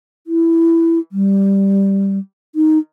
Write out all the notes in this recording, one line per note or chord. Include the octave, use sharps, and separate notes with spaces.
E4
G3
D#4